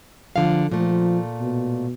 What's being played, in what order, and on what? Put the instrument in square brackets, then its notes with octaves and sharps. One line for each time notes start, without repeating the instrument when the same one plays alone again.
[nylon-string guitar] D3 F5 [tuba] F3
[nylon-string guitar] A#2 A3 [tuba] F3
[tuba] B2